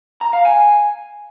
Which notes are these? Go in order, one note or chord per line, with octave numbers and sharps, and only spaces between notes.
A#5
F5
G#5